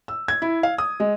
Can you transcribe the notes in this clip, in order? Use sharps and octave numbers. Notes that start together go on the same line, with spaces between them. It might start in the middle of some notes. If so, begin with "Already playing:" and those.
E6
G#6
E4
F5
D#6
G#3